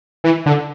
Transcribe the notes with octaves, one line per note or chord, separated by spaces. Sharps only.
E3
D3